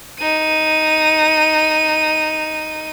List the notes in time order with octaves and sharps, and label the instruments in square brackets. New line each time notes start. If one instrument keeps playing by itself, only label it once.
[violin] D#4 D#7